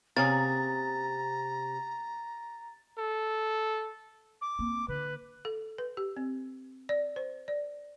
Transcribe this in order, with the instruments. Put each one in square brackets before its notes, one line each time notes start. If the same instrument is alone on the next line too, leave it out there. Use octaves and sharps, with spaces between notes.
[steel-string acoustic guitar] C3 [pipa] A#3 C#4 G#4 [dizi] A#5 [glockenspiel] A6
[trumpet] A4
[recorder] D6
[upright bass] A#3 C4
[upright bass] D3 [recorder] B4
[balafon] A4
B4
G4
C4
D5
C5
D5